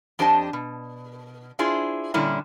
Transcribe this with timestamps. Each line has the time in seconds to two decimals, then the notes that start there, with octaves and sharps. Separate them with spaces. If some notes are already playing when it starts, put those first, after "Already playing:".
0.19 F2 D4 G4 C5 D#5 A5
0.53 B2
1.59 D4 E4 F4 G#4 C5
2.14 A#2 D3 G3 C#4 E4